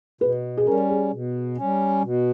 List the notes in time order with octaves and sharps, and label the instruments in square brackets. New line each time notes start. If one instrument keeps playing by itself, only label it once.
[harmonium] B2 [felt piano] B4
[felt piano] G#4
[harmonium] C#4 [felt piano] A#4
[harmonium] G3
[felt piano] G#4
[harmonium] B2
G3 C#4
B2